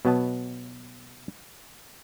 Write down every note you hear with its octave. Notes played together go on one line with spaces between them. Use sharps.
B2 F#3 B3 D#5 A5